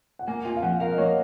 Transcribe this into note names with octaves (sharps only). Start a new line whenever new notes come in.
F#5
A#3 G#5
F4 G#5
F5
F3 F#5
A#4 F5
D#5
A#3 C#5